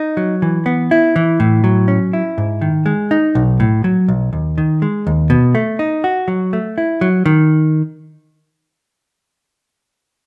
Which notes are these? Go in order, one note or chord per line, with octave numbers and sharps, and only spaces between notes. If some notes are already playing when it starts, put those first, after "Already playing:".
Already playing: D#4
F#3
E3
B3
E4
E3
A2
F#3
C#4
E4
G#2
D#3
G#3
D#4
B1
A2
F#3
B1
D#2
D#3
G#3
D#2
B2
A3
D#4
F#4
F#3
A3
E4
F#3
D#3